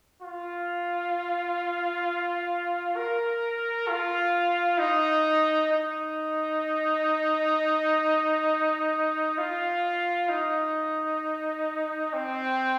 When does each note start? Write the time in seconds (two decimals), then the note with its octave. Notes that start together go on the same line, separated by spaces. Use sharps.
0.22 F4
2.96 A#4
3.88 F4
4.79 D#4
5.72 D#4
9.38 F4
10.29 D#4
12.13 C4